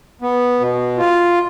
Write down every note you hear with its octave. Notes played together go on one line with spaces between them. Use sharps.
B3
B2
F4